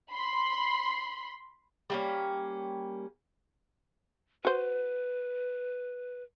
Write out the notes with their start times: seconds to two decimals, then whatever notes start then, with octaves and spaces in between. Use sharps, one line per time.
0.12 B5 C6
1.90 G3 A#3 C#4
4.45 F#4 B4 C5